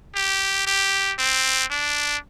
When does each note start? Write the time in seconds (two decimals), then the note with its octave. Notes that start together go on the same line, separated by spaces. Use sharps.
0.15 G4
0.67 G4
1.18 C4
1.71 D4